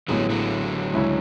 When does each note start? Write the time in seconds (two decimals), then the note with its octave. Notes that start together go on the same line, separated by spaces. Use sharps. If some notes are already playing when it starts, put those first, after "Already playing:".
0.08 A1 A2 D3 F#3 G#3 B3
0.30 D3 F#3
0.93 C#2 C#3 G#3 C#4 E4